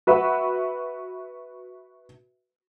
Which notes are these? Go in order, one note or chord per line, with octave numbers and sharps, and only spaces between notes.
F#4 B4 E5 F#5